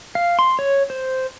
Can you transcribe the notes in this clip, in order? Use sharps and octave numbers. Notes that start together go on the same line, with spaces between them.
F5
C6
C#5
C5